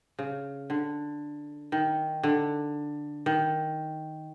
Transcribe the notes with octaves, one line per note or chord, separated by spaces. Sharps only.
C#3
D3
D#3
D3
D#3